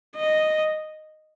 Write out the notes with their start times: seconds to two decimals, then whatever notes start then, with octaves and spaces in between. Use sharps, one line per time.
0.16 D#5